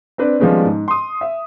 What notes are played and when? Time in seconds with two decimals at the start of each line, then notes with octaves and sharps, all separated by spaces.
0.18 C4 D4 B4
0.40 D#3 F3 G3 G#3 B3 C#4
0.65 G#2
0.88 C6 D#6
1.21 E5